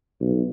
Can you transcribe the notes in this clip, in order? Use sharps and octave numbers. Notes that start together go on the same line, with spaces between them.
B1